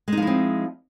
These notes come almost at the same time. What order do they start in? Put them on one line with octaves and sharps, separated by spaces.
G#3 D#4 F3 E4 C4